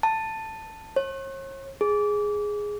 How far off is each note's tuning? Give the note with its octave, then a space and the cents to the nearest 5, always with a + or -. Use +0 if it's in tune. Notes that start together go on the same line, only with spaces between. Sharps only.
A5 +10
C#5 -40
G#4 +0